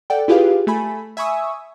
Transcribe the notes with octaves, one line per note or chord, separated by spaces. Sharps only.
A4 D5 F#5 G5
E4 F4 G4 G#4 B4 F5
A3 G#5 B5
E5 G#5 B5 C#6 D#6 E6